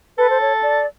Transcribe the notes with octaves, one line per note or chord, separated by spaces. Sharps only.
A4 B4
C5
C#5
D5